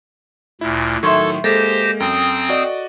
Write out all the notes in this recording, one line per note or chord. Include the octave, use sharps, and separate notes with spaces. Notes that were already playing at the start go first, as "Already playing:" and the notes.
D2 A#2 E4
A2 D#3 F#3 A4 E5 C6 C#6 G#6
G#3 A#3 G4 A4 C5 A#6
F#2 C4 G5 D#6
F#4 D5 D#5